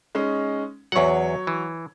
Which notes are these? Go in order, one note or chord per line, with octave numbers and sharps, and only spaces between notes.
G#3 C#4 D#4
E2 F#3 C#5 F#5
E3